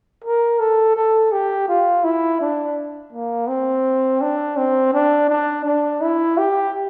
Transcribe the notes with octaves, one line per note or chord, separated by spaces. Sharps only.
A#4
A4
A4
G4
F4
E4
D4
A#3
C4
D4
C4
D4
D4
D4
E4
G4